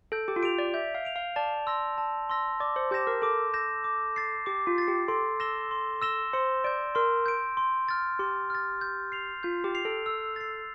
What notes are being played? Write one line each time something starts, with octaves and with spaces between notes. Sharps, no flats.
A4 G6
G4
F4
G4 D7 F7
D5
E5 G6
F5
D7 F7
F5
D5 A5
C6 E6 A#6
A5
C6 E6 A#6
D5 D6
C5
G4 G6 A#6 E7
A#4
A4 D6
G6 A#6 E7
D6
A6 C7
G4 D6
F4
A6 C7
G4
A4 C6
E6 A#6 E7 G7
C6
E6 A#6 E7 G7
C5 C6
D5 G6 D7
A#4 C6
G6 D7
C6
F6 A6
G4 C6
F6 A6
G6
C7 F7
F4 G6
G4
C7 F7
A4
E6
A6 C7